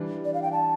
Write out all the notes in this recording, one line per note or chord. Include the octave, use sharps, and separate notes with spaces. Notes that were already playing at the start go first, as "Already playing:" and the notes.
Already playing: E3 G3 D4
D5
F5
G5
A5